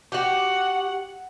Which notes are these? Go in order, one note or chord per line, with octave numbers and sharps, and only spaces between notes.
F#4 G4 F#5